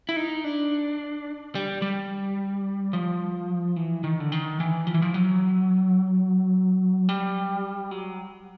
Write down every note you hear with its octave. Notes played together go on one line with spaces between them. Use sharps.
E4
D#4
D4
G3
G3
F3
E3
D#3
D3
D#3
E3
F3
E3
F3
F#3
G3
F#3